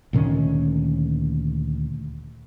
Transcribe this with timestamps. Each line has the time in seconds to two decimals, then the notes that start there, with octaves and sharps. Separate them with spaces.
0.13 D2 A#2 D#3 C#4